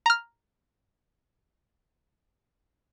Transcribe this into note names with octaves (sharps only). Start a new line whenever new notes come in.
A#5 F6